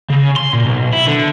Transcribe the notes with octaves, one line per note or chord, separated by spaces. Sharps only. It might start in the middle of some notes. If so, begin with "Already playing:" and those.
C#3
C6
A#2
B1
E4
D3